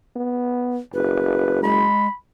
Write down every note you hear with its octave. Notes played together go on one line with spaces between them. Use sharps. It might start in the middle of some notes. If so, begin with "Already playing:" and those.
B3
F#1 B4
G#3 B5